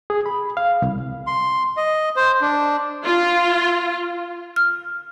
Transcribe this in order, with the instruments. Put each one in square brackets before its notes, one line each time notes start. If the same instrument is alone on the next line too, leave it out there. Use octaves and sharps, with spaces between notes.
[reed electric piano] G#4
B5
F5
C2
[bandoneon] C6
D#5
C5
D4
[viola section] F4
[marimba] F6